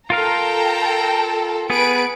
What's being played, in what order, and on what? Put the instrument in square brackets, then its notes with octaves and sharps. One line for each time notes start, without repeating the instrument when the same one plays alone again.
[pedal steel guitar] F4 A#4 F5 [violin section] A4 G5 A#5
[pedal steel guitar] B3 G#4 [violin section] B4 D7